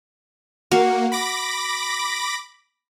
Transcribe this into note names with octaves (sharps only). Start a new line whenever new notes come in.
A#3 F#4 F5
B5 D6 A#6